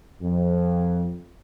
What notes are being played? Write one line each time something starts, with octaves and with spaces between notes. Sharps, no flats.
F2